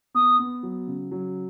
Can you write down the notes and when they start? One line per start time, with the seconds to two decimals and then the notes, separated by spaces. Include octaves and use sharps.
0.14 B3 D#6
0.39 B3
0.63 F#3
0.87 C#3
1.11 F#3